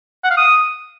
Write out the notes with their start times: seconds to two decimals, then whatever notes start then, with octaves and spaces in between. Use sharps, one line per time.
0.24 F#5
0.30 F5
0.37 D#6